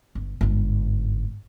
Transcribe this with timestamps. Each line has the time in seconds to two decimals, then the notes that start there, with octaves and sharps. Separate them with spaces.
0.15 G1
0.41 G1 G#2